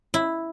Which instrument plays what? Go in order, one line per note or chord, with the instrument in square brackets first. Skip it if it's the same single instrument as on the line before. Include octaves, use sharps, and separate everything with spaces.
[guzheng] E4